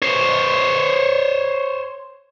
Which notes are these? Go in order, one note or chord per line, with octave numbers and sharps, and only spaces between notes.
C5 C#5